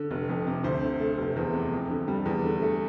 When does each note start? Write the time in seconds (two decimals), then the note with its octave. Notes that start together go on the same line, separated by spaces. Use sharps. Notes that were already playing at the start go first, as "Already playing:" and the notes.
Already playing: D3
0.11 F1
0.29 F2
0.47 C3
0.64 D2 C5
0.82 D3
1.00 A3
1.18 F1
1.36 E2
1.54 C3
1.72 F2
1.90 D3
2.08 G3
2.26 E2
2.44 D3
2.62 A3